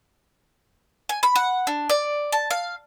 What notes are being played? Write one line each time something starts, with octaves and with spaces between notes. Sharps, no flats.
G#5
B5
F#5
D4
D5
A5
F5